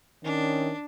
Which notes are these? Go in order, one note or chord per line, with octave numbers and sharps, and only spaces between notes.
D#3 C#4 D4